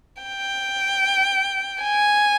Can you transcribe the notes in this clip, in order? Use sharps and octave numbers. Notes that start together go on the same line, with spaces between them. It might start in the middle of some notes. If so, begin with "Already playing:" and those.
G5
G#5